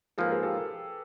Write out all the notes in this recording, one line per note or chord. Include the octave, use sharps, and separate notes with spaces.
G#2 F3 A#3 A4 B4
G#4 A#4
G4 A4